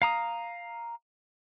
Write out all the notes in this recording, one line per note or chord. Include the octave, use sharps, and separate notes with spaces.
F5 A#5 D#6